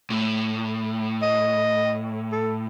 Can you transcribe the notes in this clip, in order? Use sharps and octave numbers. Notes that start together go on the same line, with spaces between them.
A2
D#5
A4